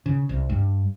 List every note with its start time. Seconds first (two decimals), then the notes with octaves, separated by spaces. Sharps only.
0.06 C#3
0.29 C2
0.49 G2